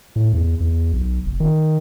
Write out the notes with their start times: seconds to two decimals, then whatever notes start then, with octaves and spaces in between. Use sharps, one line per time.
0.16 A2
0.33 E2
0.60 E2
0.93 B1
1.25 F1
1.40 D#3